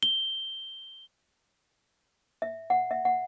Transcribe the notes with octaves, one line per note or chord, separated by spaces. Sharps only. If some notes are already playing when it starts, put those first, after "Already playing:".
G7
E5
F#5
E5
F#5